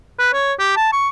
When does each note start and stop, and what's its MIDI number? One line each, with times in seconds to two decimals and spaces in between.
0.19 0.31 71
0.33 0.53 73
0.59 0.73 67
0.77 0.90 81
0.92 1.09 85